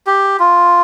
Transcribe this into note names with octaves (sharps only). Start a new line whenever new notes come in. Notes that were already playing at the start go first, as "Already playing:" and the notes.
G4
F4